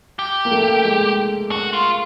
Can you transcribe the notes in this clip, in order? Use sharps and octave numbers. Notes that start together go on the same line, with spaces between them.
G4
A#3
A3
G#3
F#4
F4